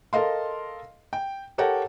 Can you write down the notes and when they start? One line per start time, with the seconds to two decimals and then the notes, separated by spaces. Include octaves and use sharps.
0.13 A4 A#4 D#5 F5 C6
1.13 G5
1.58 G4 A4 A#4 C#5 F#5 G5